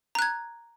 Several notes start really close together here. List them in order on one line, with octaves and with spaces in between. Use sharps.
A#5 F#6 G#6